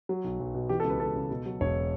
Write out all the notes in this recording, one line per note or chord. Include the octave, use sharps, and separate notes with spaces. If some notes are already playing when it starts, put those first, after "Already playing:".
F#3
B1
B1
B2
E3 G4
A4
C#2
B4
C#2 A4
C#3
B2
F#3
E1 C#5